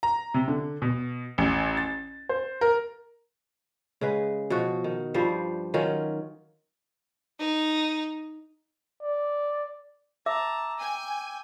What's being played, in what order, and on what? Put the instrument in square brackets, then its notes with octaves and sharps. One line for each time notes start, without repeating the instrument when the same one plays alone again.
[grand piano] A#5
C3
D3
B2
A1
A6
C5
A#4
[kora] C#3 G#3 B4
B2 F3 F#4
D#3
G2 F3 G3 C5
D#3 F#3 C#4 F4
[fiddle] D#4
[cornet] D5
[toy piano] E5 [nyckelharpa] A5 A#5 [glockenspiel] D6 E6
[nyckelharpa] G5 [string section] G#5